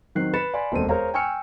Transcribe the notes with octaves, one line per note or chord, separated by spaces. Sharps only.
D#3 F#3 C4 F#6 C7
B4 B5 A6 C#7 E7
D5 F5 G#5 B5 C6
E1 D#2 C4 A4 D#7
G#4 A#4 C5 C#5 F5 A#5
G5 G#5 C#6 E6 F6 C#7